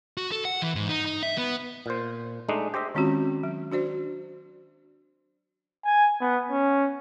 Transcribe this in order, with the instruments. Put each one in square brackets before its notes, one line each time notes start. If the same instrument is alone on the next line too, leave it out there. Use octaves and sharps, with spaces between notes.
[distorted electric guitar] F#4
A4
F#5
E3
G#2
D#4
D#4
E5
B3
[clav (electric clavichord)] A#2 C5
G#3 A3 D4 D#4
G4 C5 D#5 E5
[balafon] D#3 G#3 C4 C#4 F4 F#4
F#3
D4 F#4 C5 D5
[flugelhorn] G#5
B3
C#4